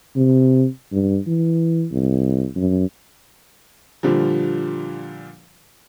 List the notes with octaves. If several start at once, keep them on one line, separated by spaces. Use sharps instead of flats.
C3
G2
E3
C2
F#2
A#2 D3 F3 G3